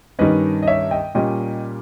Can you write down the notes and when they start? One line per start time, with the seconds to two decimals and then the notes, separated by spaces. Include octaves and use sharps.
0.19 G2 D#3 G3 C#4 B4 D#5
0.63 D#5
0.67 C#5 E5
0.91 D#5 G5
1.15 A#2 G3 C#4 D#5 G5